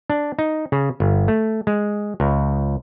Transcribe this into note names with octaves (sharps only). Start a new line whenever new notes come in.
D4
D#4
C#3
G1
A3
G#3
C#2